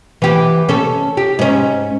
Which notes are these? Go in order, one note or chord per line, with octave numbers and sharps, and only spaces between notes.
E3 G4
C#4 A4
G4
G#2 C#4